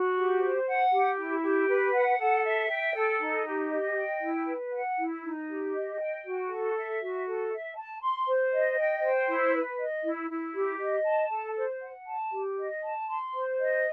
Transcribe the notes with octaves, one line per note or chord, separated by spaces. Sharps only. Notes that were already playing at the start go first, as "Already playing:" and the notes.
Already playing: F#4
G4
C5
F#5
G4
E4
G4
B4
F#5
A4
E5
G5
A4
D#4
G4
D#5
G5
E4
B4
F#5
E4
D#4
G4
D#5
G5
F#4
A4
E5
F#4
A4
E5
A5
C6
C5
D#5
G5
C5
E4
B4
D#5
E4
E4
G4
D#5
A5
A4
C5
F#5
A5
G4
D#5
A5
C6
C5
D#5